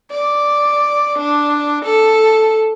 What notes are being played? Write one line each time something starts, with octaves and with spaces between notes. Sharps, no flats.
D5
D4
A4